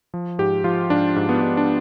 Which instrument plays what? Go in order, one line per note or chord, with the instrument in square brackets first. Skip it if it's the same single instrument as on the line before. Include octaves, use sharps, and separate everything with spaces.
[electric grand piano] F3
G#2 G4
F3 F4
G#2 D4
G#2
B3
G#2
D4